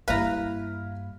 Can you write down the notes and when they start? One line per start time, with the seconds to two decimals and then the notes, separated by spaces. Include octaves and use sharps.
0.08 G2 A#3 E4 B4 F5 A#5